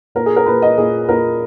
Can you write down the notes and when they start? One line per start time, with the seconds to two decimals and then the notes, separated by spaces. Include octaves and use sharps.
0.15 A#2 A#4
0.26 G#4
0.36 A#4
0.46 A#2 B4
0.62 D#5
0.77 A#2 G#4
1.09 A#2 A#4